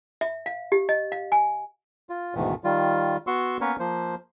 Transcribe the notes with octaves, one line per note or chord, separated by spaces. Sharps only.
E5
F5
G4
D#5
F5
G#5
F4
D2 G#2 B2 D#3 E3
D#3 G3 F4
B3 F#4 C6 C#6 E6
A#3 B3 C#4 A#4 B4 C#5
F3 A#3 C5